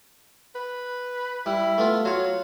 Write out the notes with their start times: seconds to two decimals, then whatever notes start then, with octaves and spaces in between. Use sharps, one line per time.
0.55 B4
1.46 G3 E4
1.78 A3 B3 F4
2.05 F#3 F4 C#5